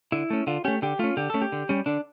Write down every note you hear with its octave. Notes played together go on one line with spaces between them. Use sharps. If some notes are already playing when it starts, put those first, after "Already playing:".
D3 E4
A3 C#4
D3 F4
A3 C#4 G4
D3 G4
A3 C#4 F4
D3 G4
A3 C#4 A4
G4
D3
G3 C#4
D3 D4